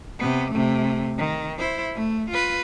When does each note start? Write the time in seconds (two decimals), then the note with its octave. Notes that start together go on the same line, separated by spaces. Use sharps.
0.19 C3 B3
0.51 C3 A3
1.18 D#3
1.59 E4 C5
1.95 A3
2.30 F4 B4